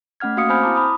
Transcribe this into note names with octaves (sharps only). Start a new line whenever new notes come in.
A3 C#4 F#5 F6 G#6
A#3 F#4 F5 D#6 C#7
C4 C5 G#5 B5 F6 G6
E4 A5 A#5 D6
B5 D#6